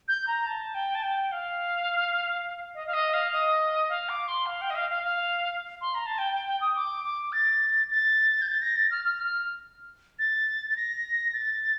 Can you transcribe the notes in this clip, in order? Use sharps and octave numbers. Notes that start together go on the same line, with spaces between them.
G6
A#5
A5
G5
A5
G5
F5
D#5
F5
D#5
F5
D#5
F5
D6
C6
F5
G5
D#5
F5
F5
F5
C6
A#5
A5
G5
G5
G5
D#6
D6
D6
A6
A6
G6
A6
A#6
A6
F6
F6
F6
A6
A6
A#6
A6